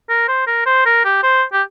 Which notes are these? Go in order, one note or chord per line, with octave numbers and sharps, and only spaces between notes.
A#4
C5
A#4
C5
A#4
G4
C5
G4